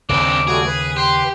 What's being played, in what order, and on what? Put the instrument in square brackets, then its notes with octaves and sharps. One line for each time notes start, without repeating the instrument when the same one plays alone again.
[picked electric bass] D#2 C#3 [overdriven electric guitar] C4 D4 [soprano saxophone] D6
[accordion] G3 A3 F#4 [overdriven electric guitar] G#4
[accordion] B4
[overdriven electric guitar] G4 [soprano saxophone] C6